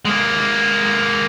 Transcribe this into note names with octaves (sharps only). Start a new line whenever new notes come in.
G#3 A#3